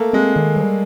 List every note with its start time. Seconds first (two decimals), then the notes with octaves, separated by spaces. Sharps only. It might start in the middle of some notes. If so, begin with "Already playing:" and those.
Already playing: A3 A#3
0.13 G#3 C4
0.36 D#3
0.56 G3